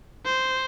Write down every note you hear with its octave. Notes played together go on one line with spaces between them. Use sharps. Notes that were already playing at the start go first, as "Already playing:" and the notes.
C5